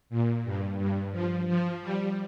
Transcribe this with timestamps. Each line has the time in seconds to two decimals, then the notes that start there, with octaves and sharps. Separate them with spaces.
0.10 A#2
0.44 G2
0.78 G2
1.12 F3
1.47 F3
1.81 G3